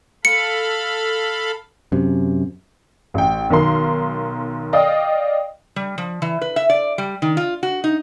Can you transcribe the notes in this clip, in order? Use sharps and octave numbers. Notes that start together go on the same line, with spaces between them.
A4 F5 B5 C#7
F#2 C3
A1 G5
B1 D#3 A#4 C6
D5 D#5 F5 G5 D#6
G3
F3
E3
B4
E5
D5
G3
D#3
F4
F#4
D#4